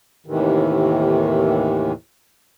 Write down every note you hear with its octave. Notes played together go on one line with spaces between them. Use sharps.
D#2 A2 C3 D#3 E3